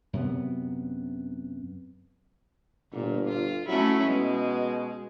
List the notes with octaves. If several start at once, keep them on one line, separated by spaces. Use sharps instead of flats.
F#2 C3 B3
G1 A#2
F4
F#3 A3 C#4 E4
B2 G#3